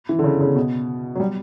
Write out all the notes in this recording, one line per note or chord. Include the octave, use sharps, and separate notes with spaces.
E3
D3
C#3
C#3
B2
F#3
G3